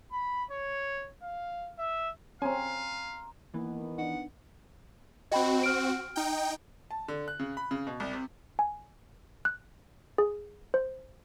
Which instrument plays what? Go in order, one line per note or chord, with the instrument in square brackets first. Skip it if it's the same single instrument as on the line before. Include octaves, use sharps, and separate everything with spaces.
[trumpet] B5
C#5
F5
E5
[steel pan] C4 C#4 [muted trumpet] F5 [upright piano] G#5 [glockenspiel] A#5 C6
[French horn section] D#3 B3 [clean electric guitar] E3 [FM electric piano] A#3
[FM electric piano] D4 D#4 [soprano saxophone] F#5
[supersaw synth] C4 F#4 [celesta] D#5 G5 B5
[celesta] F6 D7
[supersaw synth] D#4 G5
[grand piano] A5
D3
F#6
C#3
B5
C#3
B2
C2
C3
[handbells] G#5
F#6
G#4
C5